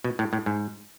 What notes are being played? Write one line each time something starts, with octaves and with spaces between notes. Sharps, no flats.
B2
A2
A2
G#2